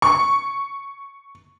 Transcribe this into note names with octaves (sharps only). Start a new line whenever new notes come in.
C#6